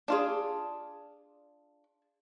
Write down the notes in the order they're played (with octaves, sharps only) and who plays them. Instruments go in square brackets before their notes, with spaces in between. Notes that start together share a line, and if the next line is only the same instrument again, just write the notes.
[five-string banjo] D4 F4 D5 [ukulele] G#4 A5